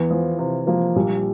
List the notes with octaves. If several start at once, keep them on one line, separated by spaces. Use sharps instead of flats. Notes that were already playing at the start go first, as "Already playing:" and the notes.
Already playing: E2 E3
F3
C3
F3 A#3
A#1 G3